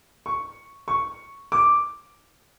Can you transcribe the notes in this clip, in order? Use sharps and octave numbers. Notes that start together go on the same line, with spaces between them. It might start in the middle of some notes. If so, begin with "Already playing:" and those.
C#6
C#6
D6